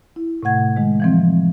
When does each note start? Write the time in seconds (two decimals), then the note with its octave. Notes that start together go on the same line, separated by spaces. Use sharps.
0.16 E4
0.43 A2 C3 A3 F#5 G#6
0.77 D#3 G#3
1.00 E3 F3 C4